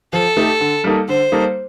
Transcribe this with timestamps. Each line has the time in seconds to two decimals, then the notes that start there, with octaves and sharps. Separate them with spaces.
0.13 F3 A4
0.37 A3 D#4 G4
0.60 D3
0.84 G3 A#3 D#4 A4
1.08 D3 C5
1.32 G3 A#3 D#4 A4